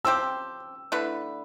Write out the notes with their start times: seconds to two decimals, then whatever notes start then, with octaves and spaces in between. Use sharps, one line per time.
0.05 F3 C4 G4 E6
0.92 D3 A3 E4 B4